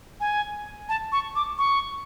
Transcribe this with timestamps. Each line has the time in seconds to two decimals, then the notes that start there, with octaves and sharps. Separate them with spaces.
0.20 G#5
0.89 A5
1.12 C#6
1.36 D6
1.58 C#6